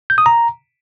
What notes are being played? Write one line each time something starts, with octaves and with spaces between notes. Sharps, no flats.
G6
D#6
A#5